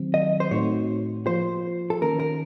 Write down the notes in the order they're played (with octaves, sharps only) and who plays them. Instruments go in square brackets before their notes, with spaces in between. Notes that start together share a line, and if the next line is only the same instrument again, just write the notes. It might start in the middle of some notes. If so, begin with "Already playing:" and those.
Already playing: [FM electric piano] D#3 F#3 C4
[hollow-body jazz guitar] D#5
C5
[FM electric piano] A2 A3 C4 D#4 F#4 [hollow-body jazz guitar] C#5
[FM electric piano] F3 A#3 F4 [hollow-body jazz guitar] C5
[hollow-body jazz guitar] A4
[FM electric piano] D#3 A#3 C#4 [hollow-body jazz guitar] A#4
[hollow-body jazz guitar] A#4